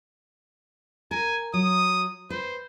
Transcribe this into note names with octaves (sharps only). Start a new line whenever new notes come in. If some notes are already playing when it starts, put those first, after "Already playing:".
A#4 G#5
F#3 D#6
B4 C5